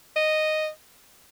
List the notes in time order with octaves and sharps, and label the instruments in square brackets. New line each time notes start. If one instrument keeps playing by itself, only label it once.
[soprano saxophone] D#5